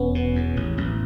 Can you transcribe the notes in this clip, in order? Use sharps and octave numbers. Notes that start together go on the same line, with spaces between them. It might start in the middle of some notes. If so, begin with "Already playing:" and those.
Already playing: E1 B3 C#4
B2
E2
A1
A1